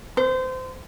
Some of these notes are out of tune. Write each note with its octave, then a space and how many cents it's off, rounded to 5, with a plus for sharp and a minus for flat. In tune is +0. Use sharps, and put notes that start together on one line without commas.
C5 -25